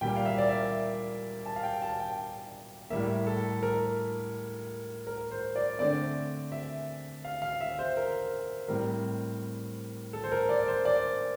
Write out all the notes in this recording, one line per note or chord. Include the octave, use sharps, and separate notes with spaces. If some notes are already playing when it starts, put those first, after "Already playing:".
A#2 G3 A#3 G5
F5
E5
D5
E5
A5
F5
G5
A5
G5
A2 G3 A#3 E5
A4
A#4
A#4
C5
D5
D3 A3 C4 D5
E5
F5
F5
E5
C5
A#4
A2 G3 C4 A#4
A4
C5
A#4
D5
C5
D5